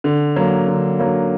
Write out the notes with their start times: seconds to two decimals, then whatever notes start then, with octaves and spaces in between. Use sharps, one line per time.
0.04 D3
0.36 F#3 A#3
0.68 D3
0.99 F#3 A#3